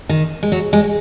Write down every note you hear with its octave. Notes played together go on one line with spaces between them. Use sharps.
D#3
G#3
F#3
G#3